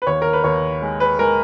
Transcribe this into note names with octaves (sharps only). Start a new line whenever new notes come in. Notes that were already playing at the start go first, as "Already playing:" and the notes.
B4
D#2 C#5
A#4
B4
D#2 C#5
G#3
B4
G#3 A#4